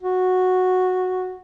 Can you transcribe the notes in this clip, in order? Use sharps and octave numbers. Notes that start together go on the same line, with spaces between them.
F#4